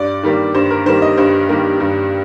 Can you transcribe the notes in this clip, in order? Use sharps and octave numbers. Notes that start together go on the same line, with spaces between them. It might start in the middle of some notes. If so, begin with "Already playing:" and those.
Already playing: G2 D5
D#3 G3 A#3
G2 C5
A#4
D#3 G3 A#3 C5
D#5
G2 C5
D#3 G3 A#3
G2